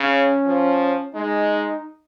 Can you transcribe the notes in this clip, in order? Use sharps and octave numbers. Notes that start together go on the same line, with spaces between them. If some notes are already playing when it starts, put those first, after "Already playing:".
Already playing: C#3 C#4
F3
G#3 D#4